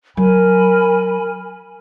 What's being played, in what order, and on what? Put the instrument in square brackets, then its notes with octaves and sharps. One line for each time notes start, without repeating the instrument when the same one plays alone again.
[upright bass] F#3 [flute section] A#4 G#5 B5